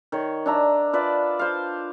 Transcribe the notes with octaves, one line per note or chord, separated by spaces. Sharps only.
D#3 C#5
D4 E5 A#5
F4 B4 D5 E5
C5 F5